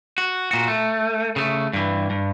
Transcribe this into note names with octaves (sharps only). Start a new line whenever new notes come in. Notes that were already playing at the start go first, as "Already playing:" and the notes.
F#4
A#2 F#4
A3
C#3 A3
G2 E3
G2